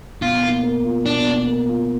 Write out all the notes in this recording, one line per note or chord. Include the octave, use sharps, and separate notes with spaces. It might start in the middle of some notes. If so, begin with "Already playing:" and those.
B2 F4
A#3
A#4
F4
B2 D4
A#3
A#4
F4